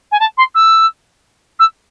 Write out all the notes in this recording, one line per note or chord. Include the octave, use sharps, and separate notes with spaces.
G#5
A5
C6
E6
E6